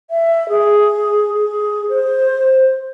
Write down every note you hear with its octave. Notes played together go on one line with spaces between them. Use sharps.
E5
G#4
G#4
C5